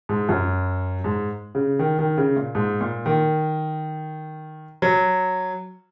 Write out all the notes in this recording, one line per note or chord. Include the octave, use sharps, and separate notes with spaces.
G#2
F#2
G#2
C#3
D#3
D#3
C#3
A#2
G#2
A#2
D#3
F#3